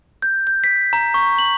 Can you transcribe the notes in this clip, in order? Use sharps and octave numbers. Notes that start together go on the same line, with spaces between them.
G6
G6
B6
A#5
C#6
F#7